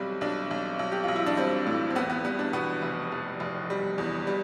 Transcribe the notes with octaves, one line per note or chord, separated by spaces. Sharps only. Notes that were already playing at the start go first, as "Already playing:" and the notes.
Already playing: B1 G3 C4
B1 D4
B1
B1
G4
B1 F4
E4
D4
G3 C4
A2
C4
E2 B3
B3
G3 B3
D4
B2 B3
F1
F1
F1
G3
E2
G3